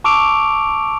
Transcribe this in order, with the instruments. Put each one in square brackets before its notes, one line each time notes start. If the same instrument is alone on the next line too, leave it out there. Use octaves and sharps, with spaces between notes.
[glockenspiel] A5 C#6 D6 E6 D7 F7